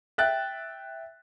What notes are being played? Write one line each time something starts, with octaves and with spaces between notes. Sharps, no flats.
E5 G5 F#6 A6